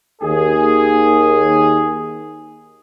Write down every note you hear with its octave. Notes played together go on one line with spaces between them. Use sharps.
D#2 G#4